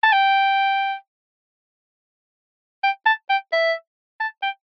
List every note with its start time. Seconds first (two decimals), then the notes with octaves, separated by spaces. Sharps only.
0.03 A5
0.13 G5
2.84 G5
3.06 A5
3.30 G5
3.53 E5
4.20 A5
4.43 G5